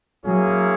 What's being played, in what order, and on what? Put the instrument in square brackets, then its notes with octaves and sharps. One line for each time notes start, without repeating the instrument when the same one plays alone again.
[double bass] F#3 [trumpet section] A#3 C#4 E4 G#4